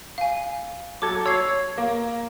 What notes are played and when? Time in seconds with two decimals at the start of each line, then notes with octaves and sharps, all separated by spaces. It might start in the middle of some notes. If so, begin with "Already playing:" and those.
0.18 F5 G#5
1.02 F#3 A4 D6 G#6
1.26 C#5 E6 G#6 C7
1.78 A#3